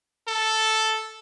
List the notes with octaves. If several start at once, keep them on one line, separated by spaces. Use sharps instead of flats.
A4